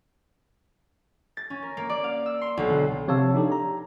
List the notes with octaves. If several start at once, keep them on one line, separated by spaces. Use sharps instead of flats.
A6
C#4
A#4
A#3
D5
F5
E6
C6
B1
D3
C3 F3 C#5 F5 A5 E6
D4 D#4 G4 A4
A#5